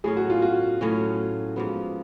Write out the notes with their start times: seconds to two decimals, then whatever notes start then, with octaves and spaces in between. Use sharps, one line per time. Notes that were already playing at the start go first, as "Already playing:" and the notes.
0.04 A2 F#3 C#4 G#4
0.17 F#4
0.30 F4
0.42 F#4
0.81 A2 F#3 C#4
1.56 G#2 F3 B3 F#4